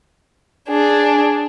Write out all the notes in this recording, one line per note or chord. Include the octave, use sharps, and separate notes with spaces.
D4 G#4